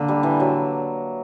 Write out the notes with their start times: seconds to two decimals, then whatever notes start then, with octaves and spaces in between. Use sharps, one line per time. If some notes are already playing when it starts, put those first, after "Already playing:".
Already playing: D3 A#3
0.08 G3
0.23 E3
0.40 F#3